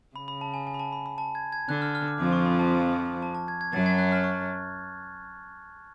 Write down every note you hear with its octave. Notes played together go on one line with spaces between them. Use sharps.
C#3 B5
B5
A5
G#5
G#5
B5
A5
B5
B5
A5
G#6
G#6
D3 F#6
F6
F6
D6
F2 F3 D6
C#6
B5
A5
A5
A5
G#6
G#6
F#2 F#3 A6
G#6
F#6
F6
C#6